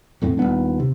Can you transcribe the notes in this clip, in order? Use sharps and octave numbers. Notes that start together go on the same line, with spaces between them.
E2 A2 F#3 C4
D#1 G3 B3 D4
C3